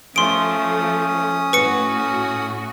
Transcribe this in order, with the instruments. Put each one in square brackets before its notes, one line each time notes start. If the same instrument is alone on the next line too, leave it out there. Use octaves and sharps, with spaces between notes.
[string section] F3 A3 [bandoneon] C#4 D#6 [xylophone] C6 D7
[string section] A2 F#4 [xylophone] B4 C#7